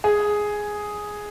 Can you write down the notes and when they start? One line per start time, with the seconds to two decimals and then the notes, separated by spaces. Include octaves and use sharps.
0.04 G#4